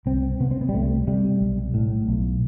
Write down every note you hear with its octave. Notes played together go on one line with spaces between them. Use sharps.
C2 C4
C3 B3
C4
B3
G3
C2 A3
C3 G3
B1
A2
B1